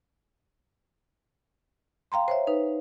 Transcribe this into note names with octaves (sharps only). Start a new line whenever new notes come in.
F5 G5 A#5 C6
C5 C#5 E5
D#4 B4